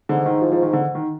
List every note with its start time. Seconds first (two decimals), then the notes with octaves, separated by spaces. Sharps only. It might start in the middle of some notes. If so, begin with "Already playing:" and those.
0.09 G#2 D3
0.26 D#3
0.41 F3
0.52 F3
0.62 D#3
0.73 D3
0.95 D#3